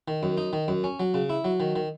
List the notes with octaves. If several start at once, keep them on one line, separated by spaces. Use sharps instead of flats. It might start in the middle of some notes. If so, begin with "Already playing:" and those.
D#3
F#2
D#4
D#3
F#2
C#4
F#3
C#3
E4
F#3
D#3
D#3